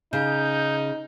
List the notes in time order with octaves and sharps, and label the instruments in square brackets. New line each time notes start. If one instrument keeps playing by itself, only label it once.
[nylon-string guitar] C#3 [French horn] D#4 [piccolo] G6